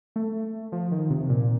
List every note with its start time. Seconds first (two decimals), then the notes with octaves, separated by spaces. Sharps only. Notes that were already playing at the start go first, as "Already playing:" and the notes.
0.16 A3
0.72 F3
0.92 D#3
1.10 C3
1.29 A#2